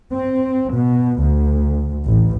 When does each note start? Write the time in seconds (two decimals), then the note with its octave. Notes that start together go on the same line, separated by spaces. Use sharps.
0.11 C4
0.73 B2
1.19 D2
2.06 A1